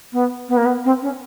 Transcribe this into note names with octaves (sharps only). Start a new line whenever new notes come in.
B3
B3
A#3
B3
C4
C#4